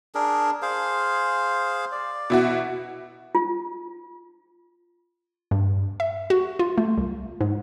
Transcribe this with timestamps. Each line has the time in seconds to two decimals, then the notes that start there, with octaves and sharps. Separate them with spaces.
0.15 D4 G#4 A#4
0.62 G#4 C5 F5
1.92 D5
2.30 B2 E4 F#4
3.35 F4
5.51 G2
6.00 E5
6.30 F#4
6.59 F4
6.78 A3
6.97 C2
7.41 G#2